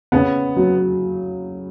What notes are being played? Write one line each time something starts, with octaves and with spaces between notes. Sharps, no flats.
C#3 B3
F#3